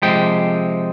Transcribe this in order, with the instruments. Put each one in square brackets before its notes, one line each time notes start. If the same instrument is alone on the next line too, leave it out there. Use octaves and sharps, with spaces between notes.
[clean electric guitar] C3 F3 G#3 G5